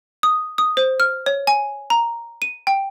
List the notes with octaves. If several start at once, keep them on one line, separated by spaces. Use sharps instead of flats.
D#6
D#6
C5
F6
C#5
G#5
A#5
D#7
G5